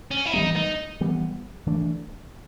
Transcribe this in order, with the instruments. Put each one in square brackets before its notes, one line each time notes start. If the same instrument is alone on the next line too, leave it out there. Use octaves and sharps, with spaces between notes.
[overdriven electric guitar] C#4
E4
[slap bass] E3 G3 B3 [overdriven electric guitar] D#4
[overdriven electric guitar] D#4
[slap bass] E3 G3 B3
E3 A3 D4